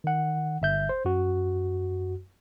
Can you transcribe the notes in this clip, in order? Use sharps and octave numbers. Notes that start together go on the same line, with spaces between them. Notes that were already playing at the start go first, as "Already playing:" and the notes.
D#3 F#5
G1 E5 G6
C5
F#2 F#4